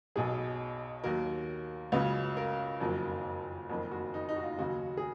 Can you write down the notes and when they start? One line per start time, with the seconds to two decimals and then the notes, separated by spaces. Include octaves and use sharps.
0.16 B1 B2 F#3 G#4
1.04 D#2 D#3 F#3 A#4
1.92 C#2 C#3 F#3 B4
2.37 A#4
2.80 F#1 F2 D#3 F#3
3.70 F#1 F2 D#3
3.91 F#4
4.14 D#4
4.29 D#4
4.36 F#4
4.44 F4
4.59 D#2 C#3 F#3 F#4
4.97 G#4